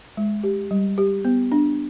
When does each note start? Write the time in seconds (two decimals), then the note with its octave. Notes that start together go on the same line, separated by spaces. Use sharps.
0.17 G#3
0.43 G4
0.71 G3
0.98 G4
1.25 B3
1.52 D4